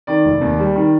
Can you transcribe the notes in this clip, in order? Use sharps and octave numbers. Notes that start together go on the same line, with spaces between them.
D#3 D5
F1
D#2
G3
D#3